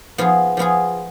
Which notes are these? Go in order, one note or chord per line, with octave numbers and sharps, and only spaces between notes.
F3 B3 F4 G#4
F3 B3 F4 G#4